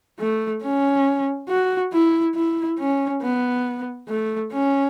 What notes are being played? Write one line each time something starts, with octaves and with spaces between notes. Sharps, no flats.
A3
C#4
F#4
E4
E4
C#4
B3
A3
C#4